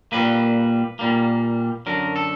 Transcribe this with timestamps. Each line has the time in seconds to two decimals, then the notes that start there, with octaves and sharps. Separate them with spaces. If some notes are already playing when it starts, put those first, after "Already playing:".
0.12 A#2 G3 A#3 B4
0.99 A#2 G3 A#3
1.86 F#2 D3 F#3 A#4
2.16 A4